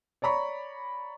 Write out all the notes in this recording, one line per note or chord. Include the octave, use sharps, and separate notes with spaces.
C#5 D5 A#5 B5 C#6